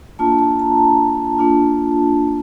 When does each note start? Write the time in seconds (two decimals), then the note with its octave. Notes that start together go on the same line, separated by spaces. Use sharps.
0.19 A#3 D4 F4 A5
0.39 A5
0.59 A#5
0.78 A5
1.38 A#3 D4 F4